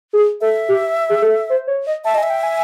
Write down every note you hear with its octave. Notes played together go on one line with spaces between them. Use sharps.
G#4
A4 E5
G4
G#4
A4
C5
C#5
D#5
E5 A5
D#5 G#5
E5
G5
G#5